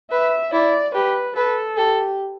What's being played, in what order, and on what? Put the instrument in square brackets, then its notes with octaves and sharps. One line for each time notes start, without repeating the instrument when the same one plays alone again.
[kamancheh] B4 [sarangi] E5
[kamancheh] E4 [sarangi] D5
[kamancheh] G4 [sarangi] B4
[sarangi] A4 [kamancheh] B4
[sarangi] G4 [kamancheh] A4